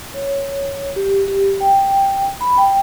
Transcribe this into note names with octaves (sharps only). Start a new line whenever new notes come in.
C#5
G4
G4
G5
B5
G5